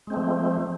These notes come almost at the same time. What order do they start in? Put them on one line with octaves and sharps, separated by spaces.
G#3 C4 A3 F3